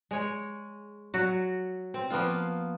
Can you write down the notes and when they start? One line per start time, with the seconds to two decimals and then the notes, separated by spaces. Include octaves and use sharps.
0.11 G#3 C#5
1.14 F#3 F#4
1.94 C4
2.10 F3 A#3 B3 F4